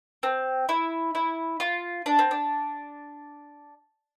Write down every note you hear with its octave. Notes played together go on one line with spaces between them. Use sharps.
C4
E4
E4
F4
D4
C4
D4